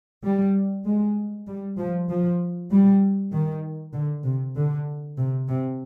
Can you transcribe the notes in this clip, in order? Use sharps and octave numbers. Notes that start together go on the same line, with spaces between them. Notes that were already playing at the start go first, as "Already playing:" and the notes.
G3
G#3
G3
F3
F3
G3
D#3
D3
C3
D3
C3
C3